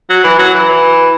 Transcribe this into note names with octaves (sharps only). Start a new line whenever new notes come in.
F#3
E3
F#3
E3
E3